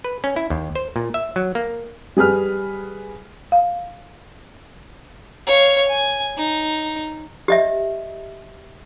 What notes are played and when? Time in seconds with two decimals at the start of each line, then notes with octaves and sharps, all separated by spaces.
0.04 B4
0.24 C#4
0.36 E4
0.50 D#2
0.75 C5
0.96 A#2
1.14 E5
1.36 F#3
1.55 A#3
2.17 G3 G#4 B4 F6
3.52 F5
5.46 C#5 F5
5.89 G#5
6.37 D#4
7.48 G4 D#5 E5